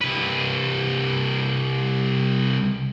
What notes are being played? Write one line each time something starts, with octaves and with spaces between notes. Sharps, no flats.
C2 B4